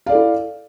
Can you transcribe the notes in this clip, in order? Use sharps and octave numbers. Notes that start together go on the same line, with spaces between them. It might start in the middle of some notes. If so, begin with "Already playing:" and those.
E4 A4 D5 F5